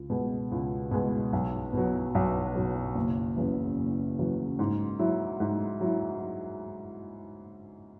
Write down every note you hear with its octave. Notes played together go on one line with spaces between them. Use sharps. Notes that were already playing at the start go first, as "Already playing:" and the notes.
Already playing: C#2
B2 G#3
C#2
B2 G#3
B1
B2 F#3
B1
B2 F#3
F#1
E2 C#3 F#3
F#1
E2 C#3 F#3
G#2
F#3 E4
G#2
F#3 E4